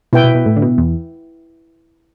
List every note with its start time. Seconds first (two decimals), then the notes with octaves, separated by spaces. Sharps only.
0.13 B2 E4 B4 G5
0.24 B2
0.35 B2
0.46 A2
0.56 D3
0.62 B2
0.78 E2